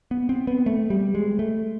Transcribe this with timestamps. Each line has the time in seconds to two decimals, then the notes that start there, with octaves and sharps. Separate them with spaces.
0.11 B3
0.29 C4
0.47 B3
0.66 A3
0.90 G3
1.15 G#3
1.39 A3